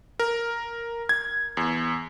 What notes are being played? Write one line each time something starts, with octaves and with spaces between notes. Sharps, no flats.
A#4
G#6
E2